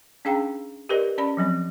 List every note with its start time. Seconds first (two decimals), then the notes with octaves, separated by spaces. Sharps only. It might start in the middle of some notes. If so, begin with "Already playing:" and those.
0.25 C#4 D4 G#4 F5 G5 A#5
0.89 G4 A#4 B4 D5 D#5
1.18 C#4 D5 B5
1.37 F3 F#3 C4